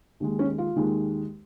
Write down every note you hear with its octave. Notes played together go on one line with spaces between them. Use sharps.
D#2 D#3 G#3
C#4
F4
D#2 D#3 G#3